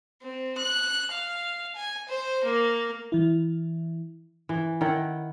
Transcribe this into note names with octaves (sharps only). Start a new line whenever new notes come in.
C4
F#6
F5
G#5
C5
A#3
E3 E4
E3
D#3 E4 F#5